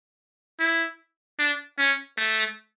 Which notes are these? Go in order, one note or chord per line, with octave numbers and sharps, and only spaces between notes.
E4
D4
C#4
A3